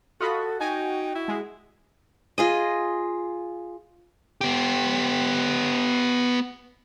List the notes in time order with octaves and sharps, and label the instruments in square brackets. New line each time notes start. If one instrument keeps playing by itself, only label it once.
[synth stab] F4 D#5 B5 [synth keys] F#4 [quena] A4
[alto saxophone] D#4 [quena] G5 [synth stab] G#5
[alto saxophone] E4
[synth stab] G#3
[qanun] F4 G#4 D#5
[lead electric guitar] B3 G4